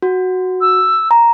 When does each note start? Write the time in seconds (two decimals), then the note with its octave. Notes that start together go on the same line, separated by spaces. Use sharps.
0.02 F#4
0.61 E6
1.11 A#5